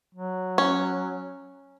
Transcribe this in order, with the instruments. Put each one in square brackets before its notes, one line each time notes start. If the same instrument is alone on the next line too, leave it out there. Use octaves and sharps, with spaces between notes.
[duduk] F#3
[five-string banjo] C#4